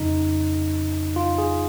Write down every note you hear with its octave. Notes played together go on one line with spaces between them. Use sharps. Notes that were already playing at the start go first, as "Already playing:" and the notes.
Already playing: F2 C#3 D#4
F4
G#4